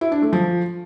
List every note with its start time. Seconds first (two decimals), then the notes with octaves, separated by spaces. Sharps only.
0.01 E4
0.12 D4
0.22 A3
0.33 F3